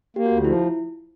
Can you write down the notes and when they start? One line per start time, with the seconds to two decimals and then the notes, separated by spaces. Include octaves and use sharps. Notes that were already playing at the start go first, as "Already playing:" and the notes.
0.16 A#3 G4
0.26 F#4
0.31 D2
0.37 F4
0.44 F3 E4